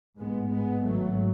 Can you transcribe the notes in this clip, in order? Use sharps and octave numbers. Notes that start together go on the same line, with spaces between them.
A1 G#2 G#3 B3
G#3 B3
G#1 G#2 F#3 A3